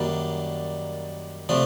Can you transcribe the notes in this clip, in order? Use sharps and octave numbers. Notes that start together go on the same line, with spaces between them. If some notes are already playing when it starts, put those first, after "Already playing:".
Already playing: F#2 D#3 G3 A#3 D4
C3 F3 A3 D4